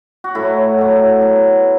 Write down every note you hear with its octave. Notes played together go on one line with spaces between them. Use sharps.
F#4
A2 F#3 E4
A2 F#3
B2 F#3